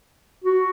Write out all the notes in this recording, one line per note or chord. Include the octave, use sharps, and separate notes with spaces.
F#4